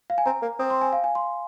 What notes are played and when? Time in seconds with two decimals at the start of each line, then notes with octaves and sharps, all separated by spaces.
0.10 F5
0.18 G#5
0.26 C4 A#5
0.42 A#3
0.59 C4 D#6
0.70 C6
0.82 G#5
0.93 F5
1.04 G#5
1.15 C6